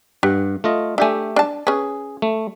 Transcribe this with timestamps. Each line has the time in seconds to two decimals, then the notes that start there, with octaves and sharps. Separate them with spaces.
0.23 G2 G4 F#5
0.64 A3 F4 D#5
0.98 A3 D4 G4 E5 G#5
1.36 D4 A5
1.67 C#4 G#4 B4
2.22 A3